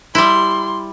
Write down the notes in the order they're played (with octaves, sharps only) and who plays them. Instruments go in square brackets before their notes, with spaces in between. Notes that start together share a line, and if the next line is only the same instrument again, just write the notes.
[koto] G3 E4 [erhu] C6